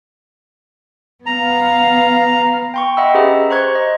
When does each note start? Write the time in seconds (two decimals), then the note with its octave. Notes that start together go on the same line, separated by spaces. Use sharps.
1.26 B3 F5 A#5
2.74 G5 C6 C#6
2.97 D#5 E5 F#5 G5 B5 E6
3.14 C#4 G4 G#4 B4 E5 A#5
3.50 C5 A#5 C6 C#6 F#6 G#6
3.75 D#5